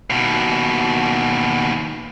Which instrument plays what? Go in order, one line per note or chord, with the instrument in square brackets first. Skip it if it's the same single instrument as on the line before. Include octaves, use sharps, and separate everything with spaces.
[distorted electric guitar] D#2 B2